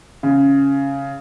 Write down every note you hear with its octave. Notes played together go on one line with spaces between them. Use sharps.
C#3